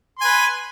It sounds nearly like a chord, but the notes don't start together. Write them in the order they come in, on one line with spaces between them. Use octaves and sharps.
C6 G#5 B4